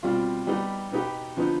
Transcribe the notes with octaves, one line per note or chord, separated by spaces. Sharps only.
B2 G3 C4 F4
G3 B3 D#4 G4
B2 B3 D#4 G4
D3 F3 B3 D#4